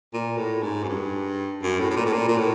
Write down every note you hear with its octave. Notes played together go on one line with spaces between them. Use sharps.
A#2
A2
G#2
F#2
G2
F#2
A2
A2
A#2
A2
A#2
A#2
A2